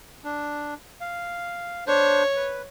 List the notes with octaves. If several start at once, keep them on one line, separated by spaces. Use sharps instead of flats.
D4
F5
D4 C5 C#5
B4